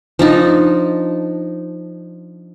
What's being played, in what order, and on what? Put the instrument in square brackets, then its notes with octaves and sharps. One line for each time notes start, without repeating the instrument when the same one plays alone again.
[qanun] F3 D4 D#4